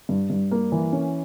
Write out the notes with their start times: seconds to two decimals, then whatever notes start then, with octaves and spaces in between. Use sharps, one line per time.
0.09 G2
0.30 G2
0.51 A#3
0.72 E3
0.93 C#4